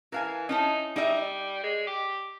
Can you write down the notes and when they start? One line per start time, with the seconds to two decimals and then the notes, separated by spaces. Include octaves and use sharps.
0.12 E3 A#4 F5 G#5
0.49 C#4 D#4 E4 A5
0.96 G3 D#4 D#5 E5
1.16 D5
1.64 G#3
1.87 G4